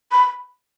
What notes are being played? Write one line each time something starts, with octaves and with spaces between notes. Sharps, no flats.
B5